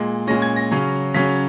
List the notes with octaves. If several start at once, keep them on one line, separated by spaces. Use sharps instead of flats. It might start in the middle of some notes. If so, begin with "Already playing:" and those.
Already playing: A#2 G#3
A#2 G#3 C#4 A#6
G#6
A#6
C#3 F#3 C#4
C#3 F#3 C#4 B6